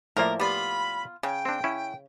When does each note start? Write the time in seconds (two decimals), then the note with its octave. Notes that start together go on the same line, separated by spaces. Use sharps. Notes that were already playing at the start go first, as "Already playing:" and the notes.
0.17 A2 F3 A#3 A#4 C5 D5 E5
0.40 B3 F4 G4 D5 B5
1.23 C#3 C#5 G5
1.45 C4 D4
1.64 C#4 E4